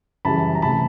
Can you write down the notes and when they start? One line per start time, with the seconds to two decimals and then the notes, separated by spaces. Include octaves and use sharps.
0.25 F#2 C#3 E3 G3 A5 B5
0.55 A#5
0.62 C3 E3 A3 A5 B5